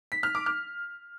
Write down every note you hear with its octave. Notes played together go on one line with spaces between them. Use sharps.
B6
F6
D6
F6